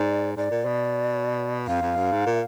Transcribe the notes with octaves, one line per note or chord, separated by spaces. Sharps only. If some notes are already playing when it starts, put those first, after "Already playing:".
Already playing: G#2 D5
G#2 D5
A#2
B2
F2 F5
F2
F#2
G#2
A#2